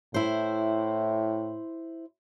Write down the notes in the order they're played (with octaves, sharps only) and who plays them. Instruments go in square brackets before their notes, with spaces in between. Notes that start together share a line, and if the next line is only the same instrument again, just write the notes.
[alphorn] A2 [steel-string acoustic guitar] E4 C5